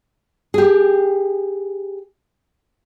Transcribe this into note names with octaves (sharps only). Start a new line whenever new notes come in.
G4 G#4